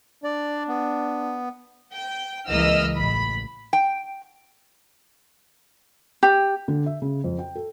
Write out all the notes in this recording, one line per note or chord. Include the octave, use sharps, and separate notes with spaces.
D4 D5
B3
G5
C#2 E3 A#3 D#5 E6 F6
A1 B5
G5
G4
D3
E5
C#3
F2
G5
A4